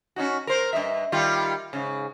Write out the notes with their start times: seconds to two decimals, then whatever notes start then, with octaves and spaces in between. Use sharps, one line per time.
0.16 C#4 D#4 F#4
0.47 A#4 C5
0.73 G2 D#5 E5
1.12 D#3 G3 F4
1.73 G#2 C#3